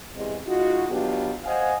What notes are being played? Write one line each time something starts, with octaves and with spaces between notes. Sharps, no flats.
E2 C3 G#3
G#3 D#4 F4 F#4
B2 F#3 B3 D4 F4 G4
C5 D#5 F5 F#5 G#5